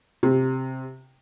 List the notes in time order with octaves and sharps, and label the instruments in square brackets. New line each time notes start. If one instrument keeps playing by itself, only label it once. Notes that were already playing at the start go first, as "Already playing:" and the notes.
[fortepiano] C3